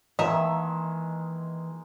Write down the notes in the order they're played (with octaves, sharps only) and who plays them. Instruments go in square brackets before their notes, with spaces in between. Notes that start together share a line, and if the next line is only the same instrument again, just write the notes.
[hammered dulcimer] D#3 G#3 A#3 [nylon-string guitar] E3 A5 [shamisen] D#4 [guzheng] E5